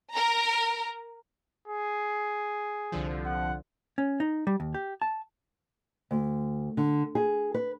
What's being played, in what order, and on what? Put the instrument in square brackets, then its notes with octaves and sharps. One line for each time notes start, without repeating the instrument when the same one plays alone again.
[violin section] A#4 A#5
[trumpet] G#4
[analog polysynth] C2 D3 F3
[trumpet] F#5
[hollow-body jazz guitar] C#4
D#4
G3
D#2
G4
A5
[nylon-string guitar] D2
D3
G#4
B4